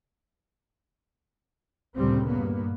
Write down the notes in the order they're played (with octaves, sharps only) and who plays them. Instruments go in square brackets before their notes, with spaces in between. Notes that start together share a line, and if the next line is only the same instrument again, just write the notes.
[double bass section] D2 G2 A#2 C#3 G3 C4
G2 A#3 B3